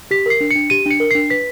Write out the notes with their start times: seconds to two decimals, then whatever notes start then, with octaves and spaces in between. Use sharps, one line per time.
0.11 G4 B6
0.26 A#4 C7
0.41 D4
0.51 C#7
0.56 D4
0.70 G4 D#7
0.86 D4 C#7
1.00 A#4
1.11 D4 C7
1.30 B4 B6